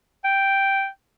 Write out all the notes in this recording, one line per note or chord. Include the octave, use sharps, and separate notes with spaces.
G5